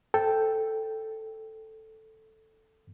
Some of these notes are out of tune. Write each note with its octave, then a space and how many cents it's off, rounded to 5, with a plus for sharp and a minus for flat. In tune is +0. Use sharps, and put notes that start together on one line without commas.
A4 +0 C5 +0 G5 +0